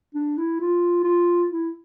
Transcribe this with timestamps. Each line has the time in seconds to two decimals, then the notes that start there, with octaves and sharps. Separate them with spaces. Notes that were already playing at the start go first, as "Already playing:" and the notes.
0.15 D4
0.38 E4
0.60 F4
1.04 F4
1.49 E4